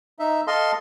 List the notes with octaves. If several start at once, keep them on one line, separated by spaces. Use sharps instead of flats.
D#4 E5
A4 D#5 F5 C6